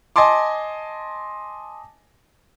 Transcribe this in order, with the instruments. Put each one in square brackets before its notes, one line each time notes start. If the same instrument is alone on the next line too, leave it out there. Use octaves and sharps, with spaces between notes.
[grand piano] D#5 G#5 A5 C6 D6